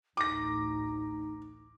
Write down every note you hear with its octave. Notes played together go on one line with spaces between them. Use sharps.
A1 D2 A2 D#4 D6 A#6